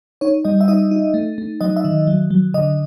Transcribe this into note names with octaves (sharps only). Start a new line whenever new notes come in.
D#4 C#5
G3 D#5
E5
D#4 D#5
D#4
A3
A3
F#3 D#5
E5
D#3
F#3
F#3
D3 D#5